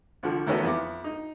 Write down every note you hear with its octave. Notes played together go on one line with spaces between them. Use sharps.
C2 D3 F3
E2 D#3 A3 B3 C#4 F#4
F2 B3 E4 D6
D#4